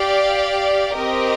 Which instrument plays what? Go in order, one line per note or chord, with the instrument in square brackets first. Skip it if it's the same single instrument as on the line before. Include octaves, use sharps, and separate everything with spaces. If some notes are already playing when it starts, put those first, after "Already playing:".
Already playing: [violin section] G4 D5 F5
C4 G4 A#4 D#5